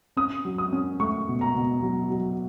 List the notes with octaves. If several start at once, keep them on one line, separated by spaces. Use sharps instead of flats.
C#4 D#6
F#3
D#6
C#4
A3 C#6
B2
A#5
B2
F#3
F#3